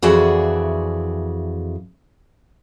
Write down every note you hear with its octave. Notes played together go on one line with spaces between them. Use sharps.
F2 E3 F#4 G#4 D5 E5